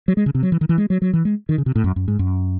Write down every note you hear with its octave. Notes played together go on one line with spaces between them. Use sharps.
F#3
G#3
C#3
C3
F#3
E3
D#3
E3
G#3
F#3
F#3
E3
G#3
D#3
C#3
C3
A2
F#2
F#2
G#2
F#2